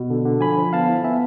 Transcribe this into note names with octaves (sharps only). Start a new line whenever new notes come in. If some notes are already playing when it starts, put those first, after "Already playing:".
Already playing: B2
D3
D3
F3 G#5 B5
F3
B3 F5 A5
E4
B3 E5 G#5